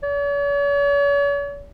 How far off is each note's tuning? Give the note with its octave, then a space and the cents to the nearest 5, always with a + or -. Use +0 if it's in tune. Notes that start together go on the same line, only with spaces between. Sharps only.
C#5 +45